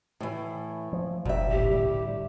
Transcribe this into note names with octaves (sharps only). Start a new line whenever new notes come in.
A2 E3
F3
F#1 D2 A#2 G3 E5
C2 A2 G4
A2 G3